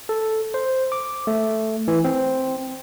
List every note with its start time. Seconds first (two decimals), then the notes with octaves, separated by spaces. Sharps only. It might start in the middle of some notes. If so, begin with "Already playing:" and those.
0.09 A4
0.54 C5
0.92 D6
1.27 A3
1.88 E3
2.05 C4